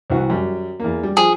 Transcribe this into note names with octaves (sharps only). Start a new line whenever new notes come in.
C2 E3 F#4
F#2 G3
E2 A#3
G3
F3 G#4